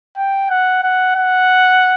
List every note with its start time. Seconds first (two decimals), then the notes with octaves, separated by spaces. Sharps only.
0.17 G5
0.50 F#5
0.83 F#5
1.15 F#5